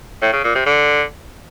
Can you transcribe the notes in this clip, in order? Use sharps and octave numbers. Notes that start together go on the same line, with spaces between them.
A2
C#3
A#2
C3
D3